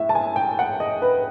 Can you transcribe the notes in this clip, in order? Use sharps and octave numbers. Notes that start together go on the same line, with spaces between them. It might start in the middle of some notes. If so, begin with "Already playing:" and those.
Already playing: A2 E5
A5
G#5
G5
F#5
D#5
B4